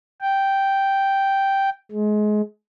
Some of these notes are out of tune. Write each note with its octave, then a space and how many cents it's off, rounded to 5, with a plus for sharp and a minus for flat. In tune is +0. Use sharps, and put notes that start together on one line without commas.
G5 -5
G#3 +25